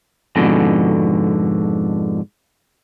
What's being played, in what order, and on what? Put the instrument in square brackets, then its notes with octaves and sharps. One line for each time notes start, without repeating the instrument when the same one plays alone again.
[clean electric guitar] F2 G#2 B2 D3